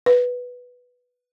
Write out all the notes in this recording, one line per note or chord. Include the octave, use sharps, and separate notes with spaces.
B4